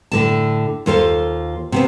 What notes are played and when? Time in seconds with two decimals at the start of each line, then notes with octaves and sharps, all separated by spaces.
0.12 A2 D3 A5
0.86 D#2 F4 A4 C5
1.72 C3 B3 C4